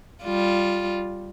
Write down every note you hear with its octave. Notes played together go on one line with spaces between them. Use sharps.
G3 F4